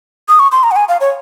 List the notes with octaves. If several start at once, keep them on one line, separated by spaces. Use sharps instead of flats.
D#6
C#6
C6
A#5
F#5
G#5
F5
C#5